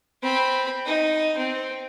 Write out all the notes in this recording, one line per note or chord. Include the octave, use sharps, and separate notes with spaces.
C4 B5
D#4
C4